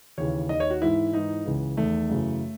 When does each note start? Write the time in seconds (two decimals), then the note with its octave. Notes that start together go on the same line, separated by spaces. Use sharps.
0.18 D#2 C#3 E3 C#5
0.49 D#2 D#3 D#5
0.60 C#5
0.70 F#4
0.81 G#2 E3 E4
1.13 G#2 E3 D#4
1.45 C#2 C#3 E3
1.77 E2 D#3 A3
2.10 F#2 C#3 E3